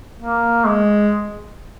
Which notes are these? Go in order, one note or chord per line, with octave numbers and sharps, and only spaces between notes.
A#3
G#3